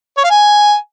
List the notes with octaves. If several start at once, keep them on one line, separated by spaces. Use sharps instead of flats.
C#5
F5
G#5